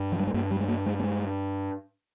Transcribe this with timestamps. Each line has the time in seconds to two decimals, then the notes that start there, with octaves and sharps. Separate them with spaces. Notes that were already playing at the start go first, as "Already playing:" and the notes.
Already playing: G2
0.12 F3
0.19 G3
0.27 G#3
0.34 G2 A#3
0.51 G3
0.60 G#3
0.68 A#3
0.86 G#3
0.99 A#3
1.03 G#3